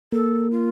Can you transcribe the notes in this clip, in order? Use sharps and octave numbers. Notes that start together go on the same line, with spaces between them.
A#3 A4
F4